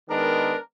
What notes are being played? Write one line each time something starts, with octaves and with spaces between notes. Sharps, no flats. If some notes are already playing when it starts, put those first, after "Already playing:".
D#3 G#3 B3 D4 A#4